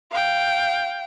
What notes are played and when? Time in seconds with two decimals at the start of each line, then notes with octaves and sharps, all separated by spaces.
0.11 F5 G5